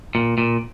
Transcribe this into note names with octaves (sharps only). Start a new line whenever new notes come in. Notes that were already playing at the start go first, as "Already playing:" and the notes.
A#2
A#2